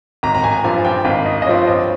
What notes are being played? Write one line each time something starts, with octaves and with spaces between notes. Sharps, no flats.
G#1 A#5
A#5
G#5
G2 F3 C4 G#5
G5
G#1 F5
D#5
D#5
G2 F3 C4 C#5
D#5